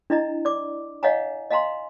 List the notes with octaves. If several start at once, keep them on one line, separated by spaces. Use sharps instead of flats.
D4 E4 D#5 A#5
D5 D6
C#5 D#5 F5 F#5 G#5 A#5
D#5 F5 G#5 A#5 C6